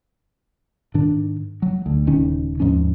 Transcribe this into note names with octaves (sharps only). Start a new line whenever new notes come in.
G#2 D#3 D4
F#3
D2
D#1 C#2 D#3 C#4
D#2 G#2 F3 C#4